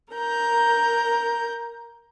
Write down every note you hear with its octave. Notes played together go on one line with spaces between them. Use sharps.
A#4 A#5 G6